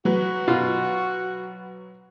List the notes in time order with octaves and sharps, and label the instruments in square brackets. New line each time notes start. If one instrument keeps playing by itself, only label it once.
[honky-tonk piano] F#3 B4 [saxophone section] F#4
[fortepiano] B2 F4